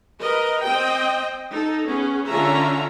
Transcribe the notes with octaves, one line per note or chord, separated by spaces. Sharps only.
A#4 B4 D#5
C4 D#5 G5
D#4 A4
B3 C#4 G#4
D3 C#4 F4 E5 A#5